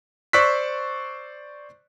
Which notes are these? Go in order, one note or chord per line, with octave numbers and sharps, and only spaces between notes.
C5 D5 C#6 E6 F#6 B6